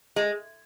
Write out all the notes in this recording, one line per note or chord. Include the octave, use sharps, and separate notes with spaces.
G#3